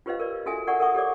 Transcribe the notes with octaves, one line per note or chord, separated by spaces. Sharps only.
F4 G4 B4 C5 D#5 F5
A#4 B4 D5
F4 F#4 A4 E5 G#5
A#4 D5 F#5 C#6
A4 A#4 E5 F#5 C#6 D#6
G4 A4 C#5 D5 D6